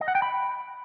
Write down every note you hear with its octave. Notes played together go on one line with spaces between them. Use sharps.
D#5
F#5
G5
B5